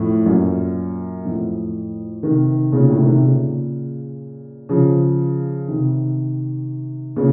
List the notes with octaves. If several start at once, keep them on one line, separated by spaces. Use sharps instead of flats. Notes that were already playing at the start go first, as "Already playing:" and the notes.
Already playing: F2 A2
F#2 A#2
F2 A2
C3 D#3
A#2 C#3
A2 C3
C3 D#3
A#2 C#3
C#3 F3
C3 D#3
A#2 C#3